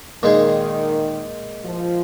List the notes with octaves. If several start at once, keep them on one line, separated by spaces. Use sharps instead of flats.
A#2 D#3 G#3 D#4 G#4
F3